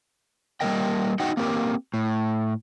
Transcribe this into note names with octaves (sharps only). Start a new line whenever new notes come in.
G3 G#3 A#3 A#4 D#5 G5
D#4 F#4 D#5 F#5 G5
A#3 C4 G4 A#4
A2